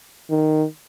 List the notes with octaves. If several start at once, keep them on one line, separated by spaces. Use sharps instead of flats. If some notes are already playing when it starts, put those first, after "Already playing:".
D#3